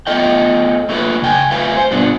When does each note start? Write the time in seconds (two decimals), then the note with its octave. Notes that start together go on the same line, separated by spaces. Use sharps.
0.07 A3 B3 F4 A4 D#5 G5
0.89 A3 A#3 F4 A4 B4
1.22 C#3 G5 G#5
1.51 F2 F3 A3 B4 F5 G#5
1.77 C5
1.91 G2 B2 B3 D4 F4